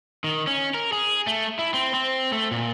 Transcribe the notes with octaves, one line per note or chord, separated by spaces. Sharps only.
D#3
C#4
A#4
G#4
A3
E4
C4
C4
A3
A#2